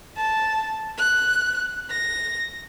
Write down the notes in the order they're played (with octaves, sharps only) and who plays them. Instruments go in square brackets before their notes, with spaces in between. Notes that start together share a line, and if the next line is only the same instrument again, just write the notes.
[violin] A5
F#6
A#6